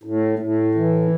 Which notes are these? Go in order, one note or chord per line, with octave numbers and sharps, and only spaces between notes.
A2
A2
E3